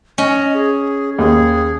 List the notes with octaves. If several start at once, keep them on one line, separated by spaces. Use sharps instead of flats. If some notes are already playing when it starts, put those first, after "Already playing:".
C#4 D#5
G#4
D#2 G#4